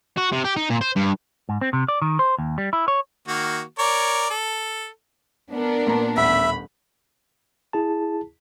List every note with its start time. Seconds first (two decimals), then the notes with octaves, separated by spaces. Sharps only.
0.18 F#4
0.32 C3
0.45 G4
0.57 D#4
0.70 A#2
0.81 C5
0.96 G2
1.49 G#2
1.61 C4
1.73 C3
1.88 D5
2.02 D#3
2.19 C5
2.38 D#2
2.58 G3
2.73 E4
2.88 C#5
3.28 D#3 A#3 F#4
3.79 A#4 C#5 D5
4.30 A4
5.54 B3 D4 A#4
5.87 A#2 A#3 A#5
6.17 D#1 A1 E5 F#5 B5
7.73 E4 G#4 A5